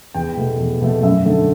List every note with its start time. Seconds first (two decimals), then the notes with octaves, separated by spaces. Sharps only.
0.14 E2 G5
0.37 B2 A3
0.59 E2
0.81 B2 A3
1.03 F#2 E5
1.25 D3 A3